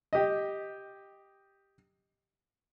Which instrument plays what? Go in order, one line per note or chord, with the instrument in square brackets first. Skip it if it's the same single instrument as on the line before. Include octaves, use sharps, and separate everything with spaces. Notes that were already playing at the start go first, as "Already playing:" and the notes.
[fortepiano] G4 D#5